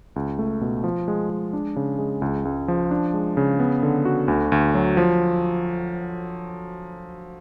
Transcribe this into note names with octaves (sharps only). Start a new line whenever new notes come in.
C#2
A3
B2
F3
G#3
G#3
D4
C#3
G#3
C#2
C#2
F3
D4
G#3
C#3
B3
D3
F#4
D2
D2
F#3
F3